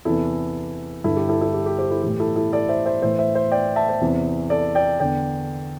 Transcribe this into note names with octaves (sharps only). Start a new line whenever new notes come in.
E2 C3 E3 E4 A4
G2 D3 E4 A4
G4
E4 A4
E4 A4
G4
G4
G4 C5
E4 A4
A2 E3 G4
E4 A4
E4 A4
A4 D5
C5 E5
C5 E5
A2 E3 C5 E5
C5 E5
C5 E5
D5 G5
E5 A5
C5 E5
E2 C3 E3
A4 D5
D5 G5
E2 D3 D5 G5